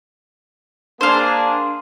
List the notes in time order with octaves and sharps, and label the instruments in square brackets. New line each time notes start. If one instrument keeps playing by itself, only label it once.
[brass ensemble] A#3 D4 G#4 [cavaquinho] C5 F5